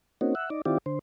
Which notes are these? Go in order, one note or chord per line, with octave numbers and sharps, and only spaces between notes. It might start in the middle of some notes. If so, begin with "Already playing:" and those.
A#3 C4 C#4 D#4 F#4
E5 F#5
D#4 D5
D#3 C4 E4 F4 G4 D5
D3 C5